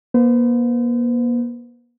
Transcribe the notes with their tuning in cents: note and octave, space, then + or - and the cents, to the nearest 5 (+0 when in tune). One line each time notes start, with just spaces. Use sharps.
A#3 +40 C5 -45